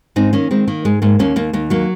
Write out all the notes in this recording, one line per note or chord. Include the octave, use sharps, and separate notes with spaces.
G#2 C4 D#4
D#3 A#3 C#4
D#3 G#3 C4
D#3 A#3
G#2 G#3
G#2 A#3
D#2 A#3 C#4
D#2 A#3
D#2 A#3
F#3 A#3